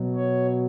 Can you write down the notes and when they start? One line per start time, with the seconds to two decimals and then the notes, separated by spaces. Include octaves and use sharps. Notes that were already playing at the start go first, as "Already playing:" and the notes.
Already playing: B2 F#3
0.15 C#5